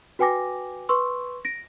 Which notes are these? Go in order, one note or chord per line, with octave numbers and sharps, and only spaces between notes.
F#4 B4 G5 G#5 D6 A#6
B4 C6 C#6 E6
A#6 D7